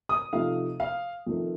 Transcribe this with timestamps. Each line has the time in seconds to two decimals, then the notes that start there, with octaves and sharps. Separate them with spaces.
0.09 D#6
0.33 C3 F3 A3 D#4 F5
0.80 F5
1.26 F2 D#3 A3